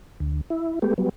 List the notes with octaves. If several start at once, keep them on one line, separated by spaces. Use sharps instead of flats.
D2
E4
G#3 A3 B3 G4
F#3 G3 B3